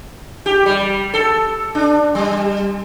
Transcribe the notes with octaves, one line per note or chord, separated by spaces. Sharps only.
G4
G3
A4
D4
G3